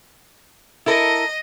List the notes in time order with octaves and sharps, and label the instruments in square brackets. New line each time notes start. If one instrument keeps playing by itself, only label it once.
[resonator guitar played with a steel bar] E4 A4 A#4 [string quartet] D#5